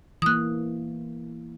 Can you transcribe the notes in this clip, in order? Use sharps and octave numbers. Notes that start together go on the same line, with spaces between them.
E3 A#3 D#6 F#6